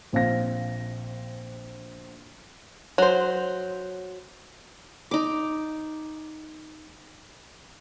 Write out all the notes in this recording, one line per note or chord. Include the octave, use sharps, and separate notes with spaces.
A#1 C4 F5 A#6
F#3 C5
D#4 D6